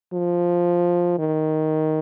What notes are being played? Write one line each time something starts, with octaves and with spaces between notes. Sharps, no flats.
F3
D#3